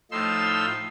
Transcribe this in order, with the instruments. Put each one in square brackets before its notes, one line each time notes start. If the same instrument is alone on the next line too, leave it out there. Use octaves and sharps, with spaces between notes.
[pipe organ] A2 F3 D#4 C6 E6